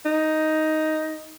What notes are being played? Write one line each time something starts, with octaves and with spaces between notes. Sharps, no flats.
D#4